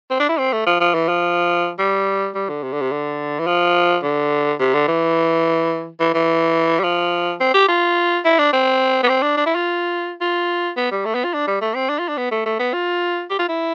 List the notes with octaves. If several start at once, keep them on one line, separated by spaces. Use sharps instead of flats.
C4
D4
E4
C4
A3
F3
F3
E3
F3
G3
G3
D3
C3
D3
C3
D3
E3
F3
D3
C3
D3
E3
E3
E3
G3
F3
C4
G4
F4
E4
D4
C4
B3
C4
D4
D4
E4
F4
F4
B3
G3
A3
B3
F4
D4
G3
A3
C4
D4
F4
D4
B3
A3
A3
B3
F4
G4
F4
E4